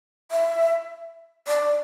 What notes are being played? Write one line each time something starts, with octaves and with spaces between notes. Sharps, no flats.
E5
D5